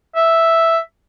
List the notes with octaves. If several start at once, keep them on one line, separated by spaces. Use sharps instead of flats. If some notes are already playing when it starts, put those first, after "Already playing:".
E5